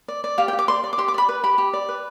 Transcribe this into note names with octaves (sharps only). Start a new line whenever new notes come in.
D5
D5
G4 F5
G5
G4
D6
D5 C6
D5
D6
G4 C6
D6
D5 B5
B4
G4 B5
G4
D5
B4